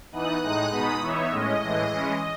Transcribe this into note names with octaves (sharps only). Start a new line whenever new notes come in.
E3 B3 D#4 D#6 F#6
A2 G#3 D#4 D#6 F#6
B2 G#3 B3 D#4 B5 D#6
E3 B3 D#4 C#5 E5
A2 G#3 C#4 D#5
A2 E3 G#3
E3 G#3 C#4